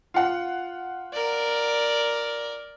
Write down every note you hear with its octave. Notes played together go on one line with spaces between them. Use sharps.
F4 F#5
A#4 D5